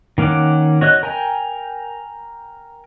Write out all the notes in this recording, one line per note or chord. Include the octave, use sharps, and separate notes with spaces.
D#3 A#3 C#4 F#5 D6
F#4 C#5 D#5 F#6
A#4 G5 G#5 A#5